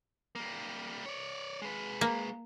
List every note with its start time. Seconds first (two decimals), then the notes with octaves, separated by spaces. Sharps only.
0.35 G3 A#3
1.06 C#5 D5
1.62 G#3 B4
2.01 A#3